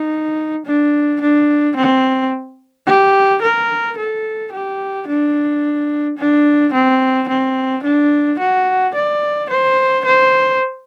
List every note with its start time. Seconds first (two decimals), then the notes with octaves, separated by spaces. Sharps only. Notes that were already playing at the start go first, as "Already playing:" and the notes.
Already playing: D#4
0.66 D4
1.21 D4
1.76 C4
2.87 G4
3.42 A#4
3.98 A4
4.52 G4
5.08 D4
6.18 D4
6.73 C4
7.29 C4
7.83 D4
8.39 F#4
8.95 D5
9.50 C5
10.05 C5